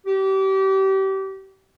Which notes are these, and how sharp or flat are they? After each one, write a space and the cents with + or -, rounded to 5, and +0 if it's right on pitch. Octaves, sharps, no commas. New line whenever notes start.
G4 -30